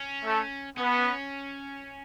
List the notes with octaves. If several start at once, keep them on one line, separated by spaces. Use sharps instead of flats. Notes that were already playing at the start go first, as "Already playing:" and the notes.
Already playing: C#4
A3
B3 C#4